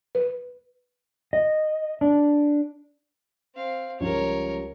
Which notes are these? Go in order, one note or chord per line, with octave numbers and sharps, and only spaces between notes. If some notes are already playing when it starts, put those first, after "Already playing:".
B4
D#5
D4
C4 F5
C#2 F3 G3 A#4 C#5